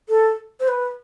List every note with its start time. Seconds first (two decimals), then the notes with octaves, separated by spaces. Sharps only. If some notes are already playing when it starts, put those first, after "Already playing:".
0.09 A4
0.60 C5
0.68 B4